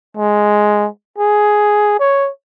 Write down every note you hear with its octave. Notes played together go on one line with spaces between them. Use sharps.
G#3
G#4
C#5